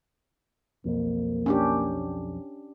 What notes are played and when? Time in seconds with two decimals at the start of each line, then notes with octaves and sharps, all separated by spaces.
0.85 B1 F2 A#3
1.46 C#4 D4 G4